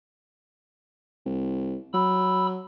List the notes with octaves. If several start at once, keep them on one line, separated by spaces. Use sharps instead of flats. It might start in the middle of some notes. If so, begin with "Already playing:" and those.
C2
F#3 B5 E6